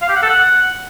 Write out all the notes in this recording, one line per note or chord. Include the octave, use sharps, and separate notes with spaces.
F5
G4
F#5
A4
F#5